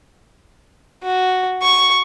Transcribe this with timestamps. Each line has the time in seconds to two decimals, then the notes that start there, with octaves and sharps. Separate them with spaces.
1.03 F#4
1.62 C#6